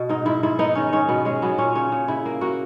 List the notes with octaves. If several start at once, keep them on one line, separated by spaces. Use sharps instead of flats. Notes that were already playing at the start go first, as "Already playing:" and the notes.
Already playing: B2
G#2 D#4
G#2 E4
G#2 E4
B3 D#4
D#3 C#4
G#2 C#4
B2 B3
G#3 C#4
F#3 B3
A#2 C#4
C#3 C#4
C#3
C#3 E4
A#3
A#3 F#4